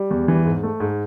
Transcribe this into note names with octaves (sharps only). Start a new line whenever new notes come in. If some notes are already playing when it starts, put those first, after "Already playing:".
Already playing: G3
E2
E3
G#2
A3
G#2